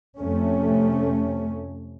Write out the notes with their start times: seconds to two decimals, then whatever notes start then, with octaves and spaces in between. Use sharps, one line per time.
0.17 F2 C3 A3 C#4